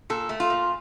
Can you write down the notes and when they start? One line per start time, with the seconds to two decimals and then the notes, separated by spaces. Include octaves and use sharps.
0.10 A#2 A4
0.29 A3
0.40 F4
0.50 A#2